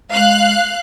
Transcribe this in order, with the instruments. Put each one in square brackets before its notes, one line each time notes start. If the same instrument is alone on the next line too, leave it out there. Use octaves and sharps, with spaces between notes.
[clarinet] G#3 [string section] F5 F#6